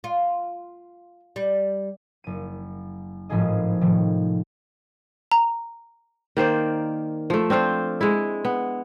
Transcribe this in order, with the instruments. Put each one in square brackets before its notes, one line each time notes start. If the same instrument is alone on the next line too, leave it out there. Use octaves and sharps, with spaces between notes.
[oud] F4
G3
[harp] F#1 D#7
G#1 A2 F3 F4 G#4 D#5
A2 C3 D#3 F3 G3
[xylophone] A#5
[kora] D#3 A#3 C5 D5
F3 A3
C4 D4 F4 C5
G#3 E4
B3